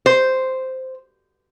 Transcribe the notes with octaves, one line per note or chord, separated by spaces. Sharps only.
C5